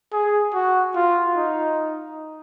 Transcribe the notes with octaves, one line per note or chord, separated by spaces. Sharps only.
G#4
F#4
F4
D#4